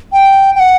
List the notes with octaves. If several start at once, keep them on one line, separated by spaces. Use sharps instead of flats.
G5
G5
F#5